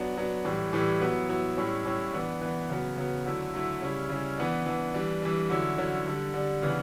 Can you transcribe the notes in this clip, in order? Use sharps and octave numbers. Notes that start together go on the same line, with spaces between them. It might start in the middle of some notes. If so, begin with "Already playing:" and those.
Already playing: F#3 B3 D4
F#3 B3 D4
A2 E3 G3
A2 E3 G3
F#3 B3 E4
F#3 B3 E4
A2 G3 C#4 E4
A2 G3 C#4 E4
E3 B3 D4
E3 B3 D4
C#3 F#3 B3
C#3 F#3 B3
D3 F#3 A3 E4
D3 F#3 A3 E4
C#3 G3 C#4 E4
C#3 G3 C#4 E4
E3 B3 D4
E3 B3 D4
E3 G3 D4
E3 G3 D4
D3 F#3 C#4 E4
D3 F#3 C#4 E4
D3 G3 D4
D3 G3 D4
C#3 E3 B3 D4